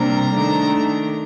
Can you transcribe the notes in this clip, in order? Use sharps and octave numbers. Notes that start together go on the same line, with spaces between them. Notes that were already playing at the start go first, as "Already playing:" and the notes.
Already playing: C3 G3 A#3 D4 A#5
D#3 A3 D4